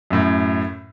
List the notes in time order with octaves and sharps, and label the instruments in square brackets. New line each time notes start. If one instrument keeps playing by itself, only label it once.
[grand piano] F#2 A2